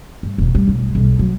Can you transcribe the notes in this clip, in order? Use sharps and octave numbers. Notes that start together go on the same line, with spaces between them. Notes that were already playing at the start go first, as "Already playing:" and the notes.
G2
E1
G3
B1 A2
B1 G3
F#3